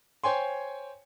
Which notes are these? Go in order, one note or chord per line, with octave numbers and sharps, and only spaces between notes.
C5 C#5 G5 G#5 C6